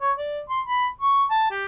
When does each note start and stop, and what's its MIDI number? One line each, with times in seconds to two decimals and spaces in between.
0.01 0.12 73
0.18 0.40 74
0.50 0.60 84
0.66 0.88 83
1.01 1.24 85
1.30 1.48 81
1.51 1.66 67